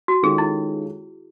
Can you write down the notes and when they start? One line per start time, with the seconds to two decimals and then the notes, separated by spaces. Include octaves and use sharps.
0.08 F#4
0.23 D#3 G#3 C#4 F4 G#4 A4
0.38 E4